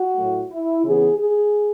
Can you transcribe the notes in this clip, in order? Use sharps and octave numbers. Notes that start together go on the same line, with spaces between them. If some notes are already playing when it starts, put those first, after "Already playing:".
Already playing: F#4
A2 F#3 A3
E4
C#3 E3 B3 G#4
G#4